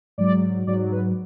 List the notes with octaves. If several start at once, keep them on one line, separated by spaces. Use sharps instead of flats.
G#2 F#3 D5
G#2 F#3 D5
B4